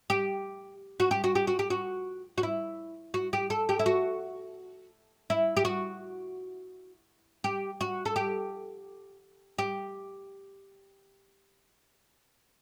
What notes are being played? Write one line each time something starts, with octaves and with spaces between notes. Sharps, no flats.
G4
F#4
G4
F#4
G4
F#4
G4
F#4
F#4
E4
F#4
G4
A4
G4
E4
F#4
E4
G4
F#4
G4
F#4
A4
G4
G4